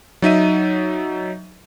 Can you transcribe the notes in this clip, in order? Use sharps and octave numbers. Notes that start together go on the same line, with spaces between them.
F#3 D#4 E5 D#7